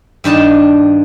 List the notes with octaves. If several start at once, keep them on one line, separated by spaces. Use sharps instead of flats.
G2 D#3 D4 A5